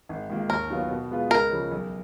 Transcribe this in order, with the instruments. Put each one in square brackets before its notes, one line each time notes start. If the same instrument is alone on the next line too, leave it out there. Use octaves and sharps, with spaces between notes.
[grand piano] G#1
G#2 D#3 A#3 F4
[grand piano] D#2 [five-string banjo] A#4
[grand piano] D#3 F#3 B3 F4
B2
G#3 B3 F4 B4
[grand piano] C#2 [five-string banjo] A#4
[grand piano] C#3 F3 G#3
B1